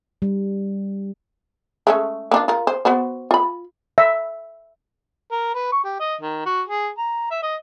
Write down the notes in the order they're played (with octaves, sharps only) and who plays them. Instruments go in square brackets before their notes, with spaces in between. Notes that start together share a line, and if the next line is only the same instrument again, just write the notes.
[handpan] G3
[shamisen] G#3 A3 C#4
A#3 D4 F4
F4 A#4
C5
B3 F#4 C5
F4 B5
[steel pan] E5
[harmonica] A#4
B4
C#6
G4
D#5
D#3
F#4
G#4
A#5
E5
D#5